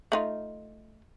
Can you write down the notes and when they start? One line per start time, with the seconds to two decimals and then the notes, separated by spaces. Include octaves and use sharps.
0.12 A3 D#4 F4